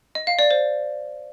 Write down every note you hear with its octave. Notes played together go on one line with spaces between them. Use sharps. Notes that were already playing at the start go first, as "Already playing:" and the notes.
D#5
F5
D5
C5